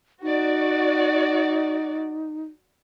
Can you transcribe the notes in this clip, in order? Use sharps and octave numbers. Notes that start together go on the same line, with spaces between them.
D#4 F#4 D5